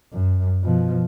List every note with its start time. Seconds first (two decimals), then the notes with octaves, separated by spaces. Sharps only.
0.12 F#2
0.63 B2 F3